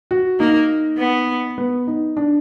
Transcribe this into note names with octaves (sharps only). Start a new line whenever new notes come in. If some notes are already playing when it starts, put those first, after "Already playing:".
F#4
A#3 D#4
B3
B3
D#4
D4